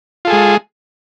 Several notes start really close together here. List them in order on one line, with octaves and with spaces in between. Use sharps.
F4 A4 G#4 G#3